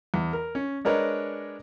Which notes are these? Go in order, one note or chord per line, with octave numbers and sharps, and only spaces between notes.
E2
A#4
C#4
G#3 D4 A#4 B4 C#5 D#5